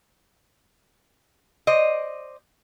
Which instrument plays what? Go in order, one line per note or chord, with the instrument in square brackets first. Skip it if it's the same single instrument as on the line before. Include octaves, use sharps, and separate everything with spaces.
[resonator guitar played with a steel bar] C5 D5 D#5